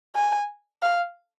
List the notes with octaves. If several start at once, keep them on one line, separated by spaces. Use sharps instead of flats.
G#5
F5